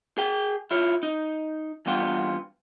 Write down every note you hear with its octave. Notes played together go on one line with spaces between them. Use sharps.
G#4 G5
E4 F4 C#5
D#4
E2 G2 B3 F4 G5